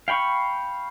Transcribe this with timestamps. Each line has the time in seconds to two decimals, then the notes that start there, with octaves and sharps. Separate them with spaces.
0.08 F5 G5 B5 C#6